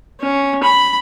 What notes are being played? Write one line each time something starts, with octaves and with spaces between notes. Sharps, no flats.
C#4
B5